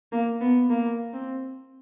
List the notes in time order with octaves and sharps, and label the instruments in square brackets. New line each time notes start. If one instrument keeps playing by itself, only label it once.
[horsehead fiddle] A#3
B3
A#3
C4